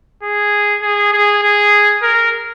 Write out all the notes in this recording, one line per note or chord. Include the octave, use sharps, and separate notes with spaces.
G#4
G#4
G#4
G#4
A#4